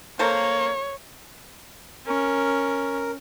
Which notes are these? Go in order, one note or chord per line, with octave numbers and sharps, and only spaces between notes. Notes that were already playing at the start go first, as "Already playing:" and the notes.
A#3 A4 A#4 C5 C#5
C#4 A#4